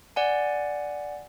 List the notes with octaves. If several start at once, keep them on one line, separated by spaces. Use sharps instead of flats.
D5 F#5 G#5